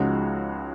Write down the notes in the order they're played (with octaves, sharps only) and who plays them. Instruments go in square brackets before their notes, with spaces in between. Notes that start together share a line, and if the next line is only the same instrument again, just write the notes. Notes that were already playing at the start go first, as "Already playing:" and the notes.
Already playing: [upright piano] C#2 C#3 F3 G#3 D#4 F#4